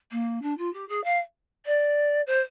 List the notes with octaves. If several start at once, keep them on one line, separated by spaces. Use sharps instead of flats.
A#3
D4
F4
G4
G#4
F5
D5
C5